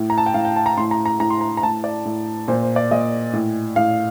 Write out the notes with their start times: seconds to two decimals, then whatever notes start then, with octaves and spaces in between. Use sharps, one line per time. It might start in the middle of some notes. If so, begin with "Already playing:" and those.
Already playing: A2
0.10 A#5
0.18 A5
0.26 G5
0.34 A2 F5
0.45 G5
0.56 A5
0.66 A#5
0.77 A2 C6
0.91 A#5
1.06 A#5
1.20 A2 A#5
1.30 C6
1.41 A#5
1.57 A#5
1.63 A2 A5
1.84 D5
2.05 A2
2.48 A#2 C5
2.63 C5
2.76 D5
2.91 A#2 D#5
3.33 A2
3.76 A2 F5